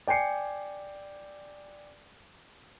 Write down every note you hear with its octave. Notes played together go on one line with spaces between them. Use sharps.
D5 G5 G#5 C7 C#7